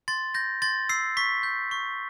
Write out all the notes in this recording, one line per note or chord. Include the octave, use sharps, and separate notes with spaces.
C6 A6
G6 A#6
C6 A6
E6 C7
C#6 B6
G6
C#6